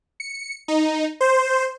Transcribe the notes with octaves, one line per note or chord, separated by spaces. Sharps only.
C#7
D#4
C5